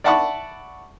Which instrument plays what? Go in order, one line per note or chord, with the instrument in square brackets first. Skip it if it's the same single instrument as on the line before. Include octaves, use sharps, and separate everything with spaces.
[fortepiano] D5 E5 F#5 A5 B5 C#6